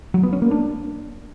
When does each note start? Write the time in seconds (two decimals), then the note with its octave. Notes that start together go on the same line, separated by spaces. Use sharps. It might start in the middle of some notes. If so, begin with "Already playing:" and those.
0.14 F#3
0.23 B3
0.33 C#4
0.42 A#3
0.51 D4